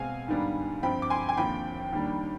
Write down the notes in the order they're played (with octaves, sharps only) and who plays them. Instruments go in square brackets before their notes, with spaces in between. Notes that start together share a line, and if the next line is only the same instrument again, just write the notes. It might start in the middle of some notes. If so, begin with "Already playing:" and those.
Already playing: [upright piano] B2 G#3 C4 F5 G#5
G#2 D#3 G3 B3 D4
G2 F3 C4 G5 B5
D6
G#5 C6
G#5
D#2 D3 F3 C4 G5 B5
D#2 D#3 G3 D4